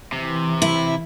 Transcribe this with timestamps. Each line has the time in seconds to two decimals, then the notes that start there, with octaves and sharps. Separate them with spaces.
0.12 C3 E3
0.62 E4